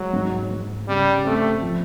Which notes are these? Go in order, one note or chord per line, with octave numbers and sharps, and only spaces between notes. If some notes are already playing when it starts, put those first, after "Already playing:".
Already playing: F#3 G#3
G#2
G#2
C#3 G3
A3 C4
F3